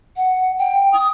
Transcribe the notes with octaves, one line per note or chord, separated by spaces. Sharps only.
F#5
G5
D#6